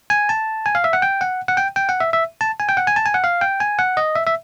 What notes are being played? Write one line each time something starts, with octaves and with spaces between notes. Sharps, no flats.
G#5
A5
G#5
F5
E5
F#5
G5
F#5
F#5
G5
G5
F#5
E5
E5
A5
G#5
G5
F#5
G#5
A5
G#5
F#5
F5
G5
G#5
F#5
D#5
E5
E5